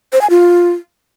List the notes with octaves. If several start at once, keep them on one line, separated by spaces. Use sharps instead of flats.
C5
G#5
F4